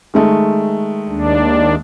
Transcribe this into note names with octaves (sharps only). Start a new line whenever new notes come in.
D#3 G#3 A3
D#2 D4